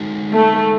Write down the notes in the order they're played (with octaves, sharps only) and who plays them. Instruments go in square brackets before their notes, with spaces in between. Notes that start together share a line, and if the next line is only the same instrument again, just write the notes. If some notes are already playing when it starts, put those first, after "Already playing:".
Already playing: [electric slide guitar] G#3 D#4 F#4 A4
[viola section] A3